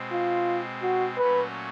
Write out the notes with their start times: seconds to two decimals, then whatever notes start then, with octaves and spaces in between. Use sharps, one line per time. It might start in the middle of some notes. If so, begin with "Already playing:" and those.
Already playing: B2 G#3 C4
0.11 F4
0.82 F#4
1.17 A#2 F#3 A3 C#4 F#4 B4